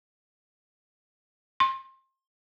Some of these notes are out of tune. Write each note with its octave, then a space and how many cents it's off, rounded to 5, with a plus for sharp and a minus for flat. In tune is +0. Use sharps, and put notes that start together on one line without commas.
C6 +30